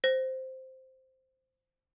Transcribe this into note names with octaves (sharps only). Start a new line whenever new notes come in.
C5 A#6